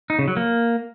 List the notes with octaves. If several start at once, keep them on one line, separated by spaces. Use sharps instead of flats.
D#4
C#3
F#3
A#3